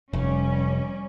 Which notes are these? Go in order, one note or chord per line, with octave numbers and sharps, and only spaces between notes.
F1 G3 C#4